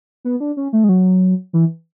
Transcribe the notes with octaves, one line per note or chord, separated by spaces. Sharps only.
B3
D4
C#4
A3
G#3
F#3
E3